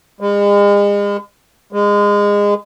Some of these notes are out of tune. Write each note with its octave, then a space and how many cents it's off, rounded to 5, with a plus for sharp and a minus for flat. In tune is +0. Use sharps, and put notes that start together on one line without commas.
G#3 -40
G#3 -25